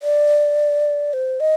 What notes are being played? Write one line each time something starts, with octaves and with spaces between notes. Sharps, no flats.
D5
C5
D#5